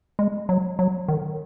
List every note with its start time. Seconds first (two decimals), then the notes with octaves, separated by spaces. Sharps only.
0.19 G#3
0.49 F#3
0.79 F#3
1.08 D#3